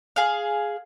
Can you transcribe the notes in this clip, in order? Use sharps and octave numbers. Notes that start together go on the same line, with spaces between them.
G#4 F5